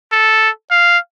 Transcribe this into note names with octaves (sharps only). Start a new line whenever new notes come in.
A4
F5